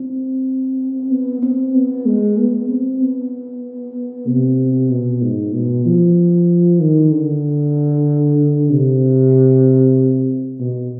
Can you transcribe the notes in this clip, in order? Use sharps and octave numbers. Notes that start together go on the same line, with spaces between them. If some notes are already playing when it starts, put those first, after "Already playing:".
Already playing: C4
B3
C4
B3
G#3
B3
C4
B3
C3
B2
G#2
B2
F3
D#3
D3
C3
B2